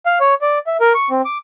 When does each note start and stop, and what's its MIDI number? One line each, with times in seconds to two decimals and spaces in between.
0.06 0.18 77
0.20 0.34 73
0.42 0.59 74
0.67 0.77 76
0.81 0.93 70
0.95 1.09 85
1.10 1.22 60
1.25 1.38 86